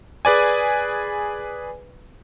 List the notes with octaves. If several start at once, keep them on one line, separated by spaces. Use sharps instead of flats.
G#4 B4 D5 G#5